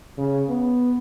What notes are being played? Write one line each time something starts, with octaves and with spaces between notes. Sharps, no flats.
C#3
B3